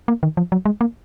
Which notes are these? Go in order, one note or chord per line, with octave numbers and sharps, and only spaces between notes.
A#3
D#3
F3
F#3
G#3
A#3